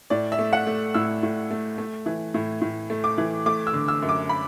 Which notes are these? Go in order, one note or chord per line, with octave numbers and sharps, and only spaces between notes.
A2 D5
E5
A3
F#5
A3
A2 E6
A2
A3
A3
E3
A2
A2
A3
D6
E3
A3 D6
E6
D3
E6
F#2
D6
B5